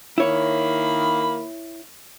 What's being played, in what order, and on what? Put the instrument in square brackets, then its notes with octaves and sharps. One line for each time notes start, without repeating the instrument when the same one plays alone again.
[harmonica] D#3 A#3 B5 [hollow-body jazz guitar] E4 C#5